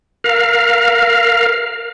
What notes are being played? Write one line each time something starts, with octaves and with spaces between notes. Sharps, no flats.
A#4 F5